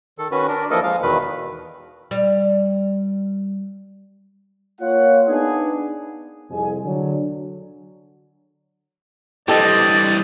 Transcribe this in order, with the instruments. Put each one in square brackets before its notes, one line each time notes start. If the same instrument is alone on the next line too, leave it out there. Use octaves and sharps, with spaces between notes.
[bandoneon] D#3 A4
D#3 C#4 F#4 B4
D4 A#4
E3 F3 A#3 A4 A#4 D#5
F3 G#3 F5
E2 B2 D#3 B4
[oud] G3
[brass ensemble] A#3 F4 C#5 F#5
B3 D4 D#4 G#4
C2 F2 G#4 G#5
D3 F#3
[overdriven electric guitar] E3 G3 [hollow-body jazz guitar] G4 A4 [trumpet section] C5 D#5 [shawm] D5